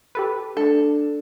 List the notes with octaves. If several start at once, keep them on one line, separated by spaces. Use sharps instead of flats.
G4 A4 B4
A3 D4 A4